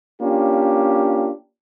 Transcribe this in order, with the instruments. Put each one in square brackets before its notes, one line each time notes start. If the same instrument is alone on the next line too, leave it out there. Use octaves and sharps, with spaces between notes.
[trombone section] A#3 C#4 D4 F4 G4